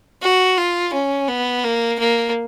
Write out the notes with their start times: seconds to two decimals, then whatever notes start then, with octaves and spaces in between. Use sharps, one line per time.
0.22 F#4
0.58 F4
0.93 C#4
1.29 B3
1.64 A#3
1.99 A#3